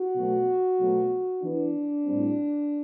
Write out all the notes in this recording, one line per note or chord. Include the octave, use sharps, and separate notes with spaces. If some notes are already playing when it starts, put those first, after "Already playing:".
Already playing: F#4
B2 F#3 A3
B2 F#3 A3
E3 B3 D4
A2 G3 C4